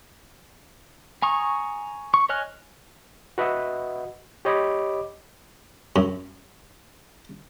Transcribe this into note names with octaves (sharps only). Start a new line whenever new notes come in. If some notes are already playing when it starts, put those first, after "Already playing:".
G#5 A#5 C#6 D#6
C#6
C#5 D#5 G#5 F6 F#6
F#4 B4 D#5 E5 F#5
G4 C#5 D#5 B5 D6
F#2